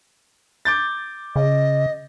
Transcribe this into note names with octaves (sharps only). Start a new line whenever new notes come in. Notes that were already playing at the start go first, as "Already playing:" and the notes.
D6 G6 A6
C#3 D#5